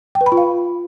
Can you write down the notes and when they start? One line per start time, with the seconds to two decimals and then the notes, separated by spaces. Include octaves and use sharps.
0.15 G5
0.21 B4
0.26 B5
0.32 F4
0.37 F5